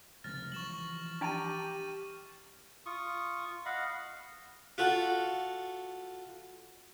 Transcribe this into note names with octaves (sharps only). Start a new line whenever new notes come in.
F1 C#2 A2 F6 A6 A#6
E3 F3 G3 C#6 E7 F#7
D4 G4 G5 A#5 A6 D#7
F4 C#6 D#6
D#5 F5 F#5 B5
F4 F#4 A4